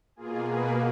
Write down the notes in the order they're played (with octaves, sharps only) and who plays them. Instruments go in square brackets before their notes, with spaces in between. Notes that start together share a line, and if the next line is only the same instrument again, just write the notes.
[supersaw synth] B2 A#3 F4 G#4
G#4 B4